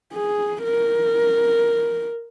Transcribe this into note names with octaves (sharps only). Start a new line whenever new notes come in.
G#4
A#4